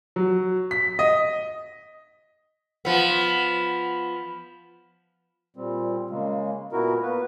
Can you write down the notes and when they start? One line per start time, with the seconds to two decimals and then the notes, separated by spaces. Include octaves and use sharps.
0.16 F#3
0.71 B6
0.99 D#5
2.85 F3 B3
5.57 A#2 G3 C4
6.10 C#3 G#3 A#3
6.72 A#2 B3 E4 F#4 A#4
7.03 A#3 B3 B4